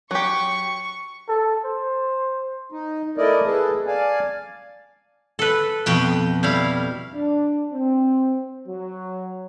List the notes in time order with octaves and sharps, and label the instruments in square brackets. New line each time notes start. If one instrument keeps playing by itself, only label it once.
[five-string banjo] F#3 G4 [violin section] C#6
[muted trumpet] A4
C5
[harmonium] D#4
A3 E4 A#4 D5 D#5
G#4 A4 B4 A5
D5 F5 G#5 A5
[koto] A4 B4
[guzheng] F2 B2 G5
[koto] G3 E4 F5
[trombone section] D4
C4
F#3